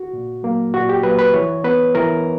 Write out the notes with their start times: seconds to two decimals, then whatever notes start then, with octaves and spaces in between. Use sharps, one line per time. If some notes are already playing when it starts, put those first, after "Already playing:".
Already playing: F#4
0.13 A#2
0.43 F#3 A#3
0.74 A#2 F#4
0.89 G4
1.03 F#3 A#3 B4
1.19 B4
1.33 E3 C#5
1.64 B3 B4
1.95 E3 A#4